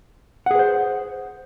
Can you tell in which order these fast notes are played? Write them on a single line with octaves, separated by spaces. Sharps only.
F#5 G#4 B4 C5